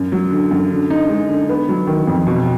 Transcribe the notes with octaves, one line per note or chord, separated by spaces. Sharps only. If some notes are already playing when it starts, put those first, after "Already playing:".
Already playing: F#2
F#3
D3
F#2
D3
D#4
G#3
D3
B3
F#3
D#3
F2
B2